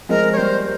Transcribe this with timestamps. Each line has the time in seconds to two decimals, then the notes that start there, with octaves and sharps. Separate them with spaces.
0.09 F3 G#3 A#4
0.33 C#5
0.37 G3 A#3 C5